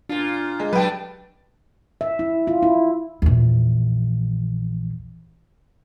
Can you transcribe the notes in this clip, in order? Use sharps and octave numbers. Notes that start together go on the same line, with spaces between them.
A#2 D4 F4
G#3
F#3 G3 A3 D4 B4 G5
E5
E4
F4
E4
A#1 E2